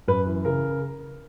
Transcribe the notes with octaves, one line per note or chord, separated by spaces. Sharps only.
F#2 B4
E3
C#3 A#4